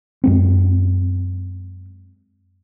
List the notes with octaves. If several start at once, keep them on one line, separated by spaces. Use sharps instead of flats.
F#2 G#3 C4